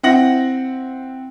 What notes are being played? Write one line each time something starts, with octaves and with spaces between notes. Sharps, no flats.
C4 E4 F#5 A#6 F#7